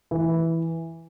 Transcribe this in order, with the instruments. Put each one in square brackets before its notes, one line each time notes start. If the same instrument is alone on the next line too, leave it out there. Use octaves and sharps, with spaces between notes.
[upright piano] E3